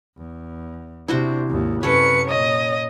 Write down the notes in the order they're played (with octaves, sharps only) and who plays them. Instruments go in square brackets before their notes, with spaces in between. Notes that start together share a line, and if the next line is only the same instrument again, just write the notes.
[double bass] E2
[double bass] C3 D4 [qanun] E4 F#4 C5
[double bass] G#1 D#2
[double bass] F#2 C3 [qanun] C#4 A4 [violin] B4 C#7
[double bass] A#2 [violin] C#5 D#5